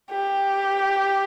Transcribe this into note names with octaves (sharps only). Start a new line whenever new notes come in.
G4